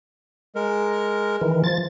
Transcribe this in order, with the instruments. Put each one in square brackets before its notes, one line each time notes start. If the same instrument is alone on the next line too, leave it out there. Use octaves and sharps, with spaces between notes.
[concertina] G#3 A#4
[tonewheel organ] D#3 E3
F3 A6